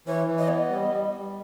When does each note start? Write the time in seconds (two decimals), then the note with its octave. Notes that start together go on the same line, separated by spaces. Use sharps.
0.07 E3 C#5
0.27 E3
0.38 D#5
0.48 B3 C#5
0.57 D#5
0.69 G3
0.90 G3
1.10 G3